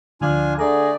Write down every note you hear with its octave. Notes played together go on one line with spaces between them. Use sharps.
D2 D3 F3 D4 F4 G#5
D3 A3 G#4 D5 A#5